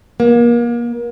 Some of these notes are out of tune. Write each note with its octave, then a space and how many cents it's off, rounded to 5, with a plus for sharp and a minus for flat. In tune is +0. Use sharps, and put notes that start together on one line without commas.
A#3 +30